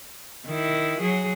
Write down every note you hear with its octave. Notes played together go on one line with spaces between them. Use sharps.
D#3 E4
F#3 G#4